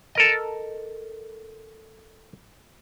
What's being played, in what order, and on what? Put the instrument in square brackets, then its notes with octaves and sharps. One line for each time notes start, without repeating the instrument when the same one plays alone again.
[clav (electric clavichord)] A4 A#4 D#5